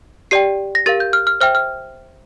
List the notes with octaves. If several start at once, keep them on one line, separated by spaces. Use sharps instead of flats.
G4 D5 G5 C7
A#6
G4 A#4 F5 A6
G6
F6
F6
C5 E5 G5 F6
F6